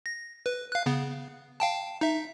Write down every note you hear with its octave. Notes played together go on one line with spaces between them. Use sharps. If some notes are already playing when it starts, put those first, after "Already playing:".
A#6
B4
F5 F#6
C#3 B3
F5 G5 A5
D#4 E5